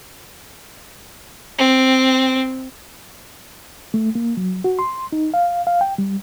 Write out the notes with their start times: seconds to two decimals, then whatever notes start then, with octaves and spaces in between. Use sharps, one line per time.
1.58 C4
3.94 A3
4.15 A#3
4.37 F#3
4.64 F#4
4.79 C6
5.12 D#4
5.34 F5
5.67 F5
5.81 G5
5.98 G3